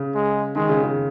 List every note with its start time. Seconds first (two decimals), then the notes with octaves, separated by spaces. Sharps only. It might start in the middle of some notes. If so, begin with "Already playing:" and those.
Already playing: C#3
0.15 G#3
0.55 D#3 G#3
0.69 C#3
0.83 C#3